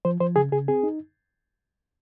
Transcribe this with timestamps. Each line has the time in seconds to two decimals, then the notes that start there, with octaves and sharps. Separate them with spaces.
0.05 F3 C5
0.20 F3 C5
0.36 C#3 G#4
0.52 C#3 G#4
0.68 C4 G#4
0.83 D#4